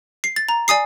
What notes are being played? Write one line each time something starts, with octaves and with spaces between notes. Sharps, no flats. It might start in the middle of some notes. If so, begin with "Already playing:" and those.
C7
A6
A#5
D5 G#5 D#6 C7